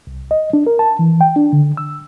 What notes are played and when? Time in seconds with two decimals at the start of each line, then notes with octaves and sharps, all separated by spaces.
0.07 C2
0.31 D#5
0.53 D4
0.67 A#4
0.79 A5
0.99 E3
1.21 G5
1.36 D4
1.53 D3
1.77 E6